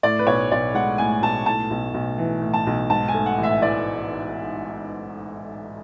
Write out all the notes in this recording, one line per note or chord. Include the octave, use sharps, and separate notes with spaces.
A2 D5
B4
B1 C#5
B1 D5
G#3 F#5
A2 G#5
B1 A5
A2 A5
B1
B1
E3
A2
A5
B1
G#2 A5
G#5
A3
F#5
A1
E5
E3 D5